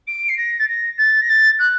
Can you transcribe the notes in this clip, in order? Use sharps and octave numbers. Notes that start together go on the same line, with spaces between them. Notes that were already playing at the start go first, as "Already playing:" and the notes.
D7
C7
A#6
A6
A#6
A6
A#6
A6
F#6